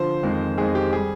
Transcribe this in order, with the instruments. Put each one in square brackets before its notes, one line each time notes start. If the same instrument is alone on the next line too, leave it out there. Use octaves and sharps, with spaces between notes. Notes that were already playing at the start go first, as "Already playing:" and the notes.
Already playing: [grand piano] D3 F3 C5
F2 D#3 G#3
F2 D#3 G#3 G#4
G4
G3 G#4